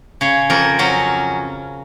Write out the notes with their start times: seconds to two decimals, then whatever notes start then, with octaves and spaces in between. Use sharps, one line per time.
0.21 C#3 C#5
0.50 F2 A#4
0.79 F#3 C#4